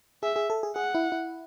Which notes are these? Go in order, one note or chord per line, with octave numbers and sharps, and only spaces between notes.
G#4 E5
G#4
A4
G#4
G#4 F#5
E4
E4